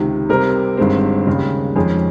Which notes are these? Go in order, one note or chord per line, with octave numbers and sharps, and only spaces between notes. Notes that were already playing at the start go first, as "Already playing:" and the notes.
Already playing: C#2 C3 D#3
C3 G3 C4 G4 A#4
G1 G2 D#3 G#3 C4
D#2 C#3 G#3
F2 D#3 G#3 C#4 G#4